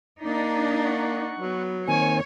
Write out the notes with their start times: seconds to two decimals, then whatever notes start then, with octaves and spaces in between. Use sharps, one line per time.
0.23 A#3 D4 D#4
0.85 F#5 C#6
1.39 F#3 B3
1.88 D#3 A#3 C4 C#5 G#5